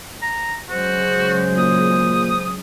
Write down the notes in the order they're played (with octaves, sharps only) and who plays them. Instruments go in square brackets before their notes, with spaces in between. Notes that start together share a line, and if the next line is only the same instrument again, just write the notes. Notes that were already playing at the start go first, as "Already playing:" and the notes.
[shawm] A#5
[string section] C#3 F#3 G#3 [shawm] F#4 [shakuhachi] C5
[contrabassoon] A#2 [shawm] D#6